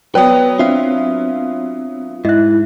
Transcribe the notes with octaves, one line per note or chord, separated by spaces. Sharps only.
F#3 B3 B4 C#5 D5 G5
C4 D4 F4 E5 F5
G#2 E4 D#5 E5 F#6